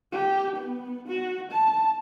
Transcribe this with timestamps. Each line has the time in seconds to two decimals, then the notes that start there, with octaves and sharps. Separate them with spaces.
0.12 G4
0.56 B3
1.08 F#4
1.52 A5